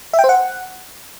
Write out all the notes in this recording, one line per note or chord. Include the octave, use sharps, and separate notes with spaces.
E5
G5
C5
F#5